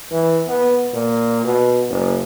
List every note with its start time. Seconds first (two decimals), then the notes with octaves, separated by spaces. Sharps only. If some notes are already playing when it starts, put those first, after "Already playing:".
0.11 E3
0.48 B3
0.93 A#2
1.44 B2
1.90 F#1